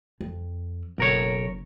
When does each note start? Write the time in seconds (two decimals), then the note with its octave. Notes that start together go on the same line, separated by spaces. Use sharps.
0.21 F2
0.98 F#1 B1 A#4 C#5